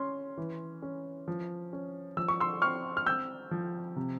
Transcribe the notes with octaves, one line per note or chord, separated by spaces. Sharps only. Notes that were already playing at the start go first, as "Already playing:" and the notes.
Already playing: C#4 C6
E3
C#4
F3
C#4
F3 E6
C#6
C6 E6
C4 C#6 F6
F6
C4 E6 G6
F3
C3